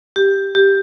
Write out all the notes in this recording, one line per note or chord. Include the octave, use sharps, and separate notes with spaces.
G4
G4